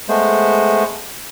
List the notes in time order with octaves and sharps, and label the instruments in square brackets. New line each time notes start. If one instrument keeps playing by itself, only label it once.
[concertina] G#3 A3 B3 C5